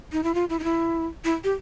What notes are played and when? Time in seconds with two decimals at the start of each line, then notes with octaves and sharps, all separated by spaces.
0.12 D#4
0.24 E4
0.34 F4
0.49 E4
0.59 D#4
0.64 E4
1.24 E4
1.44 G4